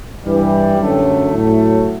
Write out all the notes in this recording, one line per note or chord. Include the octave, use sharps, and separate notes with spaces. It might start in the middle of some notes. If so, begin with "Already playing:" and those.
G2 E3 G3
F#2 D3 F#3 A3
A2 F#3 A3